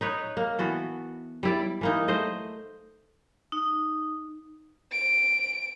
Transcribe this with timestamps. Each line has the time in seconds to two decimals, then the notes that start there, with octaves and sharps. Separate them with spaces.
0.01 D#4 B4 C#5
0.37 A#3
0.59 E3 B3 F#4 A4
1.43 G3 E4 D5
1.81 E3 A#3 D#4
2.08 A3 C5 D#5
3.52 D#4
4.92 D7